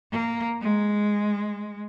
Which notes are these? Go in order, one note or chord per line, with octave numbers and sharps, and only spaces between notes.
A#3
G#3